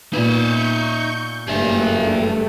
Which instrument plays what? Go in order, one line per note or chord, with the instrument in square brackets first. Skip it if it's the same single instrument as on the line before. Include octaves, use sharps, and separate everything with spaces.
[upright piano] A#2 B3 [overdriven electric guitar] D#4 E5 [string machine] C#6 G6
[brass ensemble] F#1 G2 G3 [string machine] A3 [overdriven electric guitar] G#4 E5